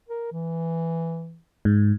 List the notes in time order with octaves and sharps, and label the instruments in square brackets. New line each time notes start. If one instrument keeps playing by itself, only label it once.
[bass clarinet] A#4
E3
[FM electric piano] G#2